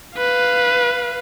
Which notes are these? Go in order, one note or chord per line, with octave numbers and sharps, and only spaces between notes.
B4 F5